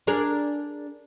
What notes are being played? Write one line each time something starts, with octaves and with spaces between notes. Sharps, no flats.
D4 G#4 A#4